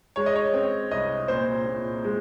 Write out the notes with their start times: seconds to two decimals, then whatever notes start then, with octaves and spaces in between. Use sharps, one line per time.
0.16 G#3 C#5
0.26 D#5
0.36 C#5
0.54 C4
0.91 C2 D#5
1.28 A#2 C5
1.66 A#2
2.04 G#3